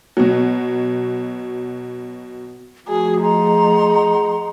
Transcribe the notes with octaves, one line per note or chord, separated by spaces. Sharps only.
B2 F#3
F3 A3 F#4 G#4
D#4 G#4 F#5 A#5 C6